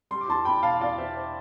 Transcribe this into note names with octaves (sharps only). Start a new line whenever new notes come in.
G3 C6
D6
E2 A5 C6
E2 G5 B5
B2 F5 A5
E2 D5 F5
E2 C5 E5
C5